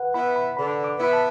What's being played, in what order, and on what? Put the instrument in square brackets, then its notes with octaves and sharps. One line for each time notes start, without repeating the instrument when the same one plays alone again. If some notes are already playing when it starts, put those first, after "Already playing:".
Already playing: [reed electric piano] B4 F#5
[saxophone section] B3 E4 [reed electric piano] B5
[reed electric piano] B5
[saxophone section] D3 [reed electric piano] B5
[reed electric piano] D6
[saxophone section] B3 E4 [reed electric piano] B5
[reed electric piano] A5